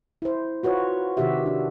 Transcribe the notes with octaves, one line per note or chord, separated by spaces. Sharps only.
E4 C5
F4 F#4 B4 C#5
C3 D#3 F#4 G4 E5
D4